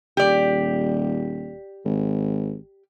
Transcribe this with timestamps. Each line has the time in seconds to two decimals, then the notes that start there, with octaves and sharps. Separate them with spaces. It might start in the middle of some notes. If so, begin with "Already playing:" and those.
0.17 D#1 G4 D5
1.85 G#1